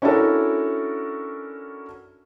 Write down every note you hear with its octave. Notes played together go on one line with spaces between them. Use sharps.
C#4 D4 E4 F#4 A4 A#4